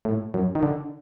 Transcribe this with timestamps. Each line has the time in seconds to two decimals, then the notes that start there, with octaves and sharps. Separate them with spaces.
0.05 A2
0.34 F#2
0.55 D#3
0.63 D3